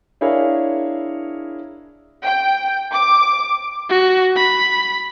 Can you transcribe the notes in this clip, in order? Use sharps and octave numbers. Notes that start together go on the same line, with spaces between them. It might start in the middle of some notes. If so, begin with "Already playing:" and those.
D4 E4 G#4 A#4 C#5 F5
G5
D6
F#4
B5